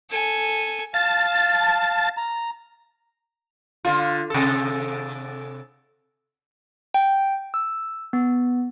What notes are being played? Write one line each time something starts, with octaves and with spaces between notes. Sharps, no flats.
A4 G#5
F5 A5
A#5
D3 F4
C3 A4
G5
E6
B3